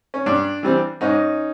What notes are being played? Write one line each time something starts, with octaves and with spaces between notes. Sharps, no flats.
C#4
G2 D4
E3 G3 C4
G#2 C#4 D#4